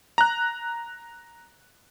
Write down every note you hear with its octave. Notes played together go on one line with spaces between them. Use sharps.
A#5 F#6